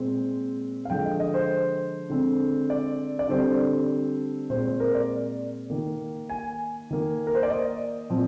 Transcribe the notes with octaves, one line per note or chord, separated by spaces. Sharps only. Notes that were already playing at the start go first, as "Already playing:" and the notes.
Already playing: A#2 G#3 C4 C5
F5
D3 F3 G#3 G5
D#5
D#5
C5
D3 G#3 C4
D5
D5
D3 G3 C4 C5
A#2 G#3 C4 C5
C5
A#4
D5
D#3 A#3
G#5
D#3 A#3
A#4
C5
D5
D#5
A#2 F3 C4